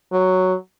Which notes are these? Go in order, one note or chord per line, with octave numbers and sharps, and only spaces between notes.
F#3